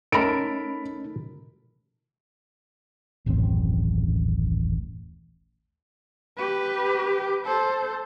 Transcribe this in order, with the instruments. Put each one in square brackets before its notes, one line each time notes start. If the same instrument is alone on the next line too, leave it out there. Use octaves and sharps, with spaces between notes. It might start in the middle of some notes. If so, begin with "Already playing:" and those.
[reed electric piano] A3 C#4 D#4 [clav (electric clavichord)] A4 A#4 [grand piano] B5 D7
[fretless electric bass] D#1 A1 F#2 C4
[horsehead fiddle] G4 B4
A4 C5